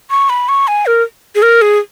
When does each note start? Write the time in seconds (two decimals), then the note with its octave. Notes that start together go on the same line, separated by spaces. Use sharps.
0.10 C#6
0.30 B5
0.49 C#6
0.68 G#5
0.86 A#4
1.35 G#4
1.42 A#4
1.62 G#4